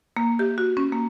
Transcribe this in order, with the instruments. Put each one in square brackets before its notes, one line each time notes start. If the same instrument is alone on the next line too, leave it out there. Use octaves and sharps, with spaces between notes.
[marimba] A#3
G4
F#4
C#4
A#3